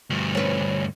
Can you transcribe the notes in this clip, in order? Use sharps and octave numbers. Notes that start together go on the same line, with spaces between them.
D2 G2
C#4 B4